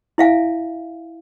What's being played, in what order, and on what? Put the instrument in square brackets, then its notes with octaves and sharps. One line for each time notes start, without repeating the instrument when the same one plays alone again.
[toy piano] E4 E5 F5 G#5